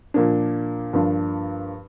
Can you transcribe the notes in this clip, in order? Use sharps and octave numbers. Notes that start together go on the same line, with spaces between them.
A#2 F3 A#3 D4
G2 F3 A#3 D4 F4